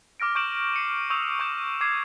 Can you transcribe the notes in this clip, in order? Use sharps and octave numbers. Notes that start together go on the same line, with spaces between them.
D6 F6 A#6 D7
C#6 F6 G6 D7 E7 F#7
C7 C#7 D#7
C#6 D#6 E6 G6 F7
C#6 D#6 G6 E7
D6 G#6 C7